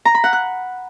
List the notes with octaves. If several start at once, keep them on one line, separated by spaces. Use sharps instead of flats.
A#5
B5
F#5
F#6